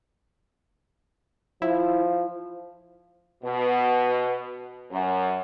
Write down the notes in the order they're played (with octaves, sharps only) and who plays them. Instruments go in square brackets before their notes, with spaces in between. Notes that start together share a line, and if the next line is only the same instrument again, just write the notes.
[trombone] F3 [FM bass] E4
[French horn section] B2
F#2